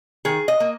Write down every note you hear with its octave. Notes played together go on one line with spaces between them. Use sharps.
D#3 G#4
D#5
A#3